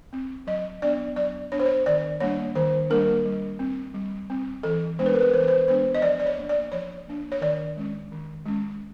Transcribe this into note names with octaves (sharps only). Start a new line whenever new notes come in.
C4
F#3 D#5
B3 D4 D5
F#3 D5
B3 D4 C#5
C5
C#5
D#3 D5
G3 A#3 D4 C#5
D#3 C5
G3 A#3 D4 A#4
G3
C4
G3
C4
E3 A4
G#3 B3 D4 C5
B4
A#4
B4
E3 C5
B4
C5
G#3 B3 D4 C5
D#5
F3 D5
D5
C#5
A#3 D4
D5
F3 C#5
A#3 D4
C#5
D#3 D5
G#3 C#4
D#3
G#3 C#4